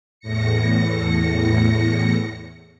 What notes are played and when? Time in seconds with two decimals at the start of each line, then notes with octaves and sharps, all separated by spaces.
0.20 E2 A2 A#6 C#7